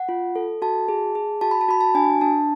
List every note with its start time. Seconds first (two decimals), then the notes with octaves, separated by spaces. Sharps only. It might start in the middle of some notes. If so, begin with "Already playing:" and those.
Already playing: F#5
0.09 F4
0.36 A4
0.62 F#4 A5
0.88 G#4
1.15 G#4
1.41 F#4 A5
1.51 B5
1.61 A5
1.68 F#4 B5
1.81 A5
1.95 D4 G#5
2.21 D4 A5